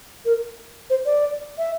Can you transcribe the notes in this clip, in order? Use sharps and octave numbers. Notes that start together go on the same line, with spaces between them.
A#4
C5
D5
E5